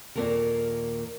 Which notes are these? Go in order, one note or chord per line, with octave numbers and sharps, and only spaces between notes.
D#2 A#2 F3 A#3 A4 A#4